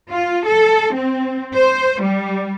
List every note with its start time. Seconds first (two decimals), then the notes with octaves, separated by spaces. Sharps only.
0.10 F4
0.46 A4
0.95 C4
1.55 C5
2.01 G3